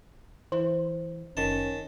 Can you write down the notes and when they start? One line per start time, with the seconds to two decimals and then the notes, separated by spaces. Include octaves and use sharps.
0.52 E3 C5
1.37 F#1 D#3 C#4 A5